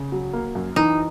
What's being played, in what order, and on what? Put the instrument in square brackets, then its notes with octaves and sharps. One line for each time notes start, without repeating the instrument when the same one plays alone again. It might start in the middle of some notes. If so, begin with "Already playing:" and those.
Already playing: [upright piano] C#3
F#3
A#3
F#2
[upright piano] E3 [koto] D#4